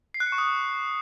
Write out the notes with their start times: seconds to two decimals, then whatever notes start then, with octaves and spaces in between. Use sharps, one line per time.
0.14 C7
0.20 F#6
0.26 C#7
0.32 C#6
0.38 D#6